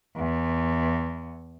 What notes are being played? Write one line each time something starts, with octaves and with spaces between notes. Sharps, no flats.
E2